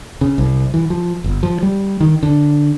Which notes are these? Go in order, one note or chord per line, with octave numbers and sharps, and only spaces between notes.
C#3
C2
E3
F3
G1
F3
G3
D#3
D3